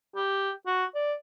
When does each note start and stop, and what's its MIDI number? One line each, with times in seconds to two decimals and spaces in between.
0.16 0.51 67
0.67 0.85 66
0.95 1.14 74